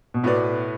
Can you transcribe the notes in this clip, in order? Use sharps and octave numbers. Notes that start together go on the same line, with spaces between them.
B2
A2 B3 F#4 B4 D5